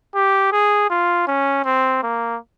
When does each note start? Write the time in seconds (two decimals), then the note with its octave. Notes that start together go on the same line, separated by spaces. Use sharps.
0.15 G4
0.52 G#4
0.90 F4
1.27 C#4
1.65 C4
2.03 A#3